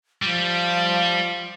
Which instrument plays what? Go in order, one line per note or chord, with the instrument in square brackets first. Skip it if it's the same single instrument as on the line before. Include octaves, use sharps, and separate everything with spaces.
[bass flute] F3 [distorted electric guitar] G3